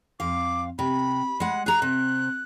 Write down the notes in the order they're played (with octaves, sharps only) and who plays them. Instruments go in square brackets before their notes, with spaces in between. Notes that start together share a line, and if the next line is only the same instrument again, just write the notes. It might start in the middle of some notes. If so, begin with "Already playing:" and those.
[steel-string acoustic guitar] F2 F5 [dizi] D6
[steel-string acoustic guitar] C3 [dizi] B5
[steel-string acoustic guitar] G#3 F#5
[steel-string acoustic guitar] G#4 A#5 [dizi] F#6
[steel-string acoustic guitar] C3